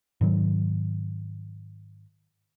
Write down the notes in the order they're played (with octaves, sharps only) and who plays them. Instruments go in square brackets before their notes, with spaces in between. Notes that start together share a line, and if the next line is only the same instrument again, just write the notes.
[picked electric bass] G#2 D#3 F#3